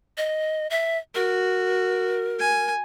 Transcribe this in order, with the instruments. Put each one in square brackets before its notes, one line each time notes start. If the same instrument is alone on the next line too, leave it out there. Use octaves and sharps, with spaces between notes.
[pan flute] D#5
E5
[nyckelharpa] F#4 [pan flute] A#4
[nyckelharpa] G#5